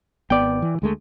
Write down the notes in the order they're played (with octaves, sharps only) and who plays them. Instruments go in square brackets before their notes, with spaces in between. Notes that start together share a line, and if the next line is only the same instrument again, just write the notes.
[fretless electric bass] G#1 B3 [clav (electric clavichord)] D5 G5
[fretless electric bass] E3
D2 G#3 A3